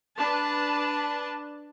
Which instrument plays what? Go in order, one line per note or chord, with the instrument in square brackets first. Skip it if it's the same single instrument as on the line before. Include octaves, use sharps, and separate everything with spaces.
[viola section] D4 B4 A5